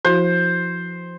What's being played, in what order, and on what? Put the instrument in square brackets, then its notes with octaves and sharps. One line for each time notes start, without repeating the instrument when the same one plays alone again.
[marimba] F3 E4 F#4 [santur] C5